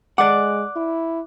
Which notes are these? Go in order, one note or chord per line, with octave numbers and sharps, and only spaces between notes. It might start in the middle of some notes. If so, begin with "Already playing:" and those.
G#3 D5 F#5 D6 F#6
E4